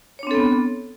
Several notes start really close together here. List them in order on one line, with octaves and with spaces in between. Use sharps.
C#5 D4 C4 A4 B3